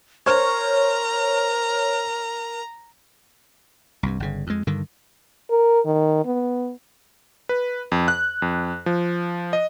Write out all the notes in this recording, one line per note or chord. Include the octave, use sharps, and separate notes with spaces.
A#4 C5 C#5 A#5 F6
C2 G2
G1 C#3
F2 G#3
G2 D3 D#3
A#4
D#3
B3
B4
F2
F#6
F2
F3
D#5